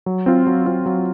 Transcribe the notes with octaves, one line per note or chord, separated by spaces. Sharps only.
F#3
C4 F4
F#3
C4 F4
F#3